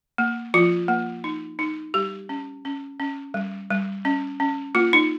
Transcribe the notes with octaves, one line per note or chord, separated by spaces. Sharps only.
A#3
F3 F4
A#3
D#4
D#4
G3 G4
C#4
C#4
C#4
G3
G3
C#4
C#4
A#3 F4
D#4